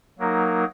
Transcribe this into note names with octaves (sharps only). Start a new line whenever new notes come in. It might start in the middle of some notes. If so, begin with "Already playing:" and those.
F#3 A#3 D#4 A#4